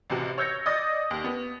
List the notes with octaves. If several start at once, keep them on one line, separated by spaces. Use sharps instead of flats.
A1 C3 F#4
C#5 E6 G6 G#6 A#6 C#7
D5 D#5 D#6 A6 A#6
D#2
B3